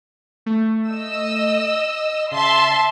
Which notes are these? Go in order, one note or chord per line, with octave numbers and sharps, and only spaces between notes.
A3
D#5 E6
C#3 E5 A5 C6